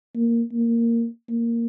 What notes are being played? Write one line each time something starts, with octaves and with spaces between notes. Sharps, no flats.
A#3
A#3
A#3